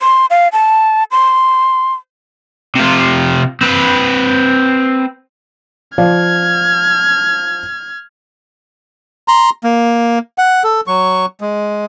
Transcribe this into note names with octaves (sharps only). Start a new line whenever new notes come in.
C6
F5
A5
C6
C3 F4
C4 B4
F3 D5 F5 F6 G#6
A#5 C6
A#3
F#5
A4
F#3 C#6
G#3